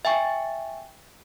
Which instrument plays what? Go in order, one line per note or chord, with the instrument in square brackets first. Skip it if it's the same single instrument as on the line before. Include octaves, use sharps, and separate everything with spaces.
[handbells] E5 G5 G#5 C#6